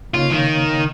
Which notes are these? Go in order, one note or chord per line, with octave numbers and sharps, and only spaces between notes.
C#3 A#3 D#4 F4 C#5 F5
D#3